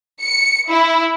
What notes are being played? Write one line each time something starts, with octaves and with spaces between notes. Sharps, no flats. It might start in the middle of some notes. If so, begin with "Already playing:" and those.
C#7
E4